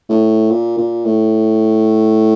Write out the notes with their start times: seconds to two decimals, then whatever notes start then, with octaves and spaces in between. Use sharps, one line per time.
0.09 A2
0.51 A#2
0.78 A#2
1.05 A2